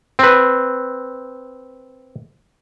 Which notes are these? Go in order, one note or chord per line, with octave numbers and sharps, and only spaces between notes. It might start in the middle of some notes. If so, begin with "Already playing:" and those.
C4 B4